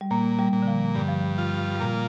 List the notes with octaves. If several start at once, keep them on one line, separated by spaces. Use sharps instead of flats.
G3
A#2 A#3
G3
A#2
D3
F3
G2 D3
F3
D3
F3 F4
G3
A#2 A#3